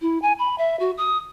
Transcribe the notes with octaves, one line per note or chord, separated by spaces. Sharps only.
E4
G#5
B5
E5
F#4
D#6